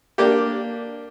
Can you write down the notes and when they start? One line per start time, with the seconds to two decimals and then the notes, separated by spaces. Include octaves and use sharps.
0.18 A#3 D4 G4